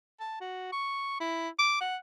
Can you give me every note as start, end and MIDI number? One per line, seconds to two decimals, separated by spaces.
0.20 0.39 81
0.41 0.72 66
0.72 1.18 85
1.20 1.49 64
1.59 1.76 86
1.81 1.96 78